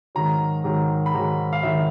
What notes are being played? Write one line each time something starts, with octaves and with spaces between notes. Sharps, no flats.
G#2 D#3 F#3 A#5
G#2 D#3 F#3
B5
G#2 D#3 F#3 A#5
F5
D#3 F#3 E5